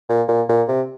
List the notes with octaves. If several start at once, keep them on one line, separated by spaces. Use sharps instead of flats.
A#2
A#2
A#2
C3